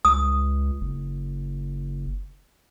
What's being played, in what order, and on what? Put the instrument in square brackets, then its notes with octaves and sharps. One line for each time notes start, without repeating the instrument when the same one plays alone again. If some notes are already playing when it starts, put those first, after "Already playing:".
[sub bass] C#2 [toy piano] D#6
[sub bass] F#1